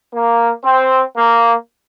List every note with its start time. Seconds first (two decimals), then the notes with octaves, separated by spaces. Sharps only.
0.13 A#3
0.64 C4
1.17 A#3